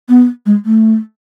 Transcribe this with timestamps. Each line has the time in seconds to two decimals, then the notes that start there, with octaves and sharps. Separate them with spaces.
0.09 B3
0.46 G#3
0.65 A3